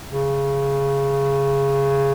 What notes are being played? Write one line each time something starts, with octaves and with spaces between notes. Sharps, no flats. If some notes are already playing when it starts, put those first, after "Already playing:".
C#3